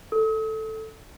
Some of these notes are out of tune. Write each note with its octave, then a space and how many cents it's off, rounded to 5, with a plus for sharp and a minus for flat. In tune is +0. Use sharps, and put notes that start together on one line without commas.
A4 +0 D#6 +45